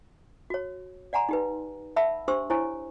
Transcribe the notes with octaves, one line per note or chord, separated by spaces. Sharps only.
F#4 C#5
D5 F#5 G#5 A#5 C6
D#4 G4 B4
E5 F#5 A5 B5 E6
D4 G4 C5 C6 C#6 E6
E4 C5 C#5 G#5 C#6